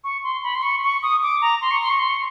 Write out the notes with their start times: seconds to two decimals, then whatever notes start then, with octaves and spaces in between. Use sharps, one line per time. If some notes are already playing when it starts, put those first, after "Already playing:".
0.04 C#6
0.24 C6
0.43 B5
0.55 C6
0.62 C#6
0.83 C#6
1.03 D#6
1.23 D6
1.42 A#5
1.62 C6
1.71 C#6
1.81 C6
1.90 C#6
1.99 C6
2.09 C#6